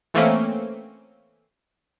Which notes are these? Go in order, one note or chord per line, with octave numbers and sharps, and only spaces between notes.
E3 A3 A#3 C4 C#4